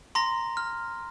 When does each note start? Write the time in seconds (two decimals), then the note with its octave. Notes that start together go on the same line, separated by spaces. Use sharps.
0.15 A#5 C6 A#6
0.57 F6